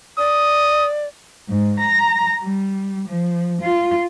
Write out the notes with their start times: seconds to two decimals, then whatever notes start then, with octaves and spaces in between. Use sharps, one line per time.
0.18 D5 D#6
1.48 G#2
1.80 A#5
2.42 G3
3.08 F3
3.61 F4